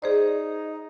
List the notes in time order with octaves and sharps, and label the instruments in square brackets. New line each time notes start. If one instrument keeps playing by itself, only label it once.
[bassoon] D#4 [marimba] G#4 C5 D5